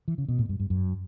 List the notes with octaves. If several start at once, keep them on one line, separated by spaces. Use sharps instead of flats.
E3
C#3
B2
A2
G2
G2
F#2